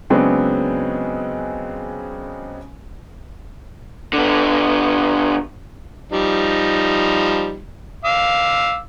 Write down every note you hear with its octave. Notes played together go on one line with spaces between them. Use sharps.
C#3 F#3 G#3 B3 C4 D4
D3 B3
F3 G3 D#4
F5 D6 E6